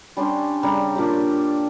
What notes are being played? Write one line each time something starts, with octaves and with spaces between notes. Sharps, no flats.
G3 C#4 D4 C6
C#3 G3 A#5
A#2 D4 G4